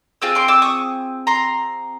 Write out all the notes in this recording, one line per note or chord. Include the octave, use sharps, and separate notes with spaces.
C4 F4 G#4 E6
C6 D6
D6 E6
C#6 D#6
A#5 C6